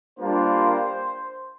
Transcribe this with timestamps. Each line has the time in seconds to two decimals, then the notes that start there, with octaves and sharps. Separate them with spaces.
0.18 G3 A#3 D4 F4 C5